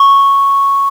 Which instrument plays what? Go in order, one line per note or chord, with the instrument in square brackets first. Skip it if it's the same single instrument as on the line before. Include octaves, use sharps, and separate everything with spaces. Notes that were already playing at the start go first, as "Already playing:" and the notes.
Already playing: [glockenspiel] C#6